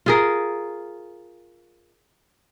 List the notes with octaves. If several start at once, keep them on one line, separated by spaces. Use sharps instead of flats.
F4 G#4 A#4